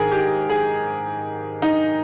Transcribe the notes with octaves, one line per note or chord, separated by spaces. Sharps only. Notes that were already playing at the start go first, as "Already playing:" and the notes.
Already playing: G#2 D#3 G#4 A#4
G4
G#4
D#4